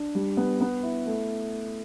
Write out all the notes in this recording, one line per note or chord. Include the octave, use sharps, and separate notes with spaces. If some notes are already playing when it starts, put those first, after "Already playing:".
Already playing: D4
G3
B3
B3
E4
A3